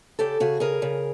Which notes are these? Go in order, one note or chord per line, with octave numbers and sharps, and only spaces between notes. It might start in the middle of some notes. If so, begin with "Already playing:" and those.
C#3 G4 A4
C#3 F#4 G#4
C#3 G#4 A#4
C#3